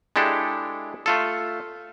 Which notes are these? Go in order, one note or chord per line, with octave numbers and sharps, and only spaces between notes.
G#3 D4 E4 G4 A4
A3 F4 A4